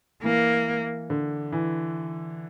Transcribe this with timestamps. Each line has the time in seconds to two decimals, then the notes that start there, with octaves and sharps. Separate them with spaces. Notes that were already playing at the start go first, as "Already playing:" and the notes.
0.23 E3 A#3
1.10 D3
1.53 E3